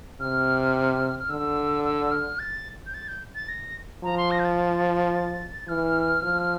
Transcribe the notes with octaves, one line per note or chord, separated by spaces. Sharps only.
C3 F6
F6
D3 E6
E6
E6
F6
A6
G6
A6
G6
A6
A#6
F3 A#5
C6
A#6
G6
A6
E3 F6
F3